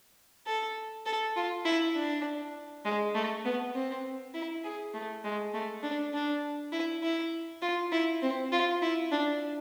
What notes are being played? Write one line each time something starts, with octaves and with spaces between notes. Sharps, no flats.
A4
A4
F4
E4
D4
G#3
A3
B3
C4
E4
G#4
A3
G#3
A3
D4
D4
E4
E4
F4
E4
C4
F4
E4
D4